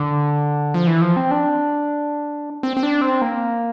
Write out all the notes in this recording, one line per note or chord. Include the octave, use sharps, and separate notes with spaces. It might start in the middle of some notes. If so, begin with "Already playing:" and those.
Already playing: D3
F3
E3
F3
C4
D4
C4
C4
D4
C4
A#3